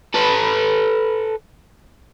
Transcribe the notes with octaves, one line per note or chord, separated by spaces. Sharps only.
A4 B4